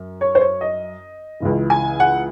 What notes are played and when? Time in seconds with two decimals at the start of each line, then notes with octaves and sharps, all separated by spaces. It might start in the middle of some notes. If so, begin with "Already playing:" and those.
Already playing: F#2
0.21 C#5
0.35 C5
0.41 C#5
0.61 D#5
1.40 C#2 C#3 E3
1.70 G#5
2.00 F#5